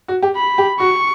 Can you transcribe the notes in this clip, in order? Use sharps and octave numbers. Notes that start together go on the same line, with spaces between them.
F#4
G4
B5
G4
F#4 C#6